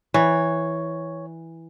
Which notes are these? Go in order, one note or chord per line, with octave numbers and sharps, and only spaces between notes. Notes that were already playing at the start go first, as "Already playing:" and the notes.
E3 C#5